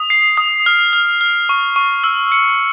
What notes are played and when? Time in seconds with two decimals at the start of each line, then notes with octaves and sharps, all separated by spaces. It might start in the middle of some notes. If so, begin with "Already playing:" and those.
Already playing: D#6
0.10 C7
0.37 D#6
0.66 F6
0.93 F6
1.21 F6
1.49 C#6
1.76 C#6
2.04 E6
2.32 C#7